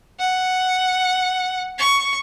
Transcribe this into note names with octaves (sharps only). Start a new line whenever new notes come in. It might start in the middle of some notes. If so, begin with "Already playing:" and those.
F#5
C#6